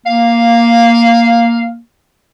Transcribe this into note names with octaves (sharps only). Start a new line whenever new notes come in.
A#3 F5